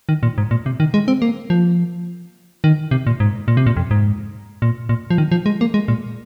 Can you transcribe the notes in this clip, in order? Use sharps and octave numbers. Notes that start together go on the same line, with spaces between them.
D#3
A#2
G#2
A#2
C3
D#3
G#3
C4
A#3
F3
D#3
C3
A#2
G#2
A#2
C3
A#2
F2
G#2
A#2
A#2
F3
D#3
F3
G#3
A#3
G#3
A#2